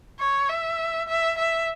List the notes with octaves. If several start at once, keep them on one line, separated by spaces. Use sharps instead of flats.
C#5
E5
E5
E5